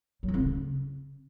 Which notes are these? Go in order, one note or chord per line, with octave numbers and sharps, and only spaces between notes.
F#3
E4
C4
C#3